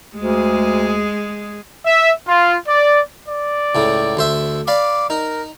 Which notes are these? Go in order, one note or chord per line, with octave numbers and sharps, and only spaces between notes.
D2 G#3 G#4
E5
F4
D5
D5
C#2 A2 C#3
D2 C5 E5
D5 F5 B5 D6
D#4 A#4